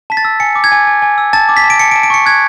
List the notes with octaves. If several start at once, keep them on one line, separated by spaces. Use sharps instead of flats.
A5 B6
A6
E6
G#5 C#7
D6
G#6
G#5
G#5
G#5
E6
A5 A6
D6
B6
A5
D7
A5 C#7
D7
A5
D7
C#6 C#7
F#6 G#6